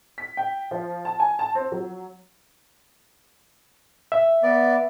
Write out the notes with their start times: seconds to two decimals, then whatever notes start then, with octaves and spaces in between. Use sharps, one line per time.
0.18 B6
0.37 G5
0.71 F3
1.05 A5
1.20 G#5
1.39 A5
1.55 C4
1.72 F#3
4.12 E5
4.43 B3 D5